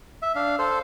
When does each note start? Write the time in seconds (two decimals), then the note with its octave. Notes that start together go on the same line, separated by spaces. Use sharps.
0.22 E5
0.35 D4 F5
0.59 A4 C5